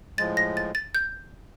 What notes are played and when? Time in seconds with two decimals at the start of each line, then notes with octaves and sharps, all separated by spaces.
0.18 A2 F3 G#3 A6
0.37 A#6
0.57 A6
0.75 A6
0.95 G6